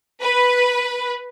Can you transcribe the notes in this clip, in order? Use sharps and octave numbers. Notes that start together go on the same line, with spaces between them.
B4